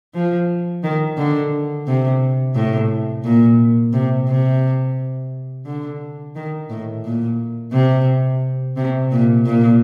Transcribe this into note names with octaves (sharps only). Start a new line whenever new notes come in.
F3
D#3
D3
C3
A2
A#2
C3
C3
D3
D#3
A2
A#2
C3
C3
A#2
A#2